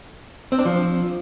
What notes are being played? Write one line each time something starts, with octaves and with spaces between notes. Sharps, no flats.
C4
D4
F3